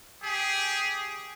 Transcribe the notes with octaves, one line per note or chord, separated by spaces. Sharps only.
G4 G#4